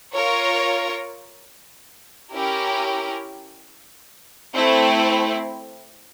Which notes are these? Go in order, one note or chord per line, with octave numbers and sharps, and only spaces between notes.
F4 A#4 C#5
C#4 E4 G4 A#4
A3 C4 E4